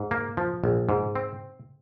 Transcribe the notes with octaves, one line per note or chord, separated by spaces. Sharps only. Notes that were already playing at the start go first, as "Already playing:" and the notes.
Already playing: G#2
A#3
F3
A#1
G#2
C4